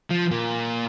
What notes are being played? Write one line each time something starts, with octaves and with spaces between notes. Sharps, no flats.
F3
A#2 A#3